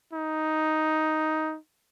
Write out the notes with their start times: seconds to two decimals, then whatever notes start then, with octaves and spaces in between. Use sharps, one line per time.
0.13 D#4